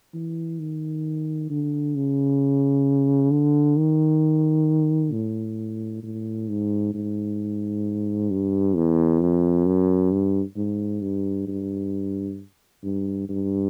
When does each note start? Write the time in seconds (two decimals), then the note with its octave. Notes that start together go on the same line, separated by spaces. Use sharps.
0.14 E3
0.59 D#3
1.50 D3
1.95 C#3
3.31 D3
3.77 D#3
5.12 A2
6.03 A2
6.49 G#2
6.94 G#2
8.30 G2
8.76 E2
9.21 F2
9.66 F#2
10.11 G2
10.57 G#2
11.02 G2
11.47 G2
12.84 G2
13.29 G2